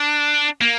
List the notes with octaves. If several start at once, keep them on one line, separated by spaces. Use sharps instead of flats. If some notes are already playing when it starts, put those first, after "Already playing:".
Already playing: D4
A#3